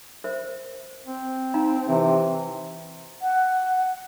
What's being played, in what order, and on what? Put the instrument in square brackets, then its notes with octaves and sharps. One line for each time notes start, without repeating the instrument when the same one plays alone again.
[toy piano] A#4 C5 E5
[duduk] C4
[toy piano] D#4 F5 A#5
[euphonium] C3 [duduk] E3
[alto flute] F#5